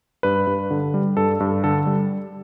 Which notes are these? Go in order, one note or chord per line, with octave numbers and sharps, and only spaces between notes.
G2 B4
G2
D3
G3
G2 A4
G2
D3 A4
G3